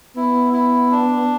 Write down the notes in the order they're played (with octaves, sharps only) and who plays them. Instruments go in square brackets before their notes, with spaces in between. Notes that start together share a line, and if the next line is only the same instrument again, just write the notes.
[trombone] B3 [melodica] E4
[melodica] E4
D4